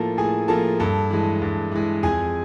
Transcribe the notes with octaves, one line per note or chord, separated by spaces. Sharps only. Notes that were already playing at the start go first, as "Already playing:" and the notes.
Already playing: A2 F3 A#3 A4 A5
A2 G#4 G#5
F3 A#3 A4 A5
G2 A4 A5
E3 G#3
G2
E3 G#3
F2 G#4 G#5